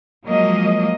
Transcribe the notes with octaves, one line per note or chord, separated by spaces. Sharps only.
F3 F#3 G#3 A#3 D#5